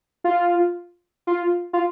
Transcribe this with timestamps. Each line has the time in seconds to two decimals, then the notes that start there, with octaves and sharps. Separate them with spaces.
0.24 F4
1.27 F4
1.73 F4